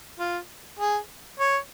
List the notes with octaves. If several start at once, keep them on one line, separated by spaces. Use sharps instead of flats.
F4
G#4
C#5